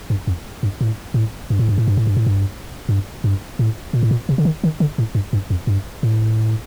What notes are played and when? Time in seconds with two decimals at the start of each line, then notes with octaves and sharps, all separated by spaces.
0.10 G2
0.27 F2
0.63 G2
0.81 A2
1.14 A2
1.50 G2
1.59 A2
1.69 G2
1.78 A2
1.88 G2
1.97 A2
2.07 G2
2.16 A2
2.26 G2
2.89 G2
3.24 G2
3.59 A2
3.93 A#2
4.03 A2
4.11 A#2
4.29 C3
4.38 D3
4.45 D#3
4.64 D#3
4.80 D3
4.98 A2
5.15 G2
5.33 G2
5.50 F2
5.67 G2
6.03 A2